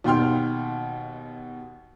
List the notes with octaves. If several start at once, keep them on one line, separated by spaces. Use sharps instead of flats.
D#2 B2 G5 C6 F6